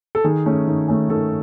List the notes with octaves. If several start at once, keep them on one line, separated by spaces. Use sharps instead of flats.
A4
D#3 G#4
A3 C#4
D#3
A3 C#4
D#3 A4